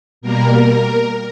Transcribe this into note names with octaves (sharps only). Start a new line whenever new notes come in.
B2 G3 A#3 A#4